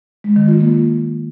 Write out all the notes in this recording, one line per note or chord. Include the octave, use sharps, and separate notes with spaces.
G#3
D#3
F4
A#3